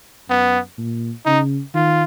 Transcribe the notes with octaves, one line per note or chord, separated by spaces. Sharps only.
F#2 B3
A#2
C#3 D#4
D#3 F4